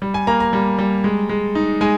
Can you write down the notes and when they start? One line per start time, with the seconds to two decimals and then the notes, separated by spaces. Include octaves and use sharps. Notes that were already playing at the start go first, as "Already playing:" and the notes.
0.02 G3
0.14 G#5
0.27 A#3 A#5
0.40 A#5
0.53 G3
0.78 G3
1.04 G#3
1.29 G#3
1.55 D#4
1.81 G#3 G#5